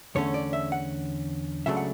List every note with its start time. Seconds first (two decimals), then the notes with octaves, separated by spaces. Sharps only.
0.15 E2 D3 A3 C#4 C#5
0.34 D5
0.53 E5
0.72 F#5
1.66 C#2 C#3 F#3 A3 D4 E5
1.77 F#5